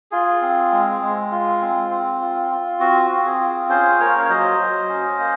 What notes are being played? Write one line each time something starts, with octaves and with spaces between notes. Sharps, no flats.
F4 G#4
C4
G#3
G#3
F4
C4
C4
F4
F4
C4 F#4
C4
G#4
F4
C#4 G#4 C5
A#3 A#4 C#5
C#5
F#3 C5 D#5
F#3
C#4
A#3